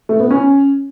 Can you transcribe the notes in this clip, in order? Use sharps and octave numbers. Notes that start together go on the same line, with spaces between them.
A3
B3
C#4